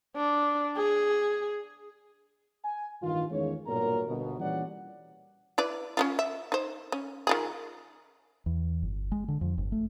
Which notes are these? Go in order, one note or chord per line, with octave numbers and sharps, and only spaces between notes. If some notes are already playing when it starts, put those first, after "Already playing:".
D4
G#4
G#5
A1 G2 D#3 F4
E2 D#3 G#3 C#4 C#5
B1 G2 A#2 F#3 A#4 A#5
G1 B2
A#2 E3 G3 C#4 D5 F#5
E4 B4 D5
C#4 E4 F4
E5
D#4 C5
C#4
D#3 F4 G#4
E2
G1
G#3
D3
F2
G1
A3